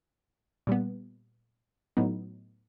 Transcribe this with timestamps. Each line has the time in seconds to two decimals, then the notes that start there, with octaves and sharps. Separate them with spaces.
0.67 A#2 G3 B3
1.97 A2 F#3 B3 D#4